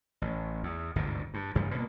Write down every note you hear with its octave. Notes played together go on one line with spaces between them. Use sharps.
A1
E2
G1 D2 G#2 C3
G2
A1 G2 C#3 G3
B2 A#3